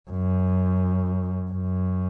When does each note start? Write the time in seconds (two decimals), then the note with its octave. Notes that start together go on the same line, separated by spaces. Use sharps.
0.10 F#2
1.51 F#2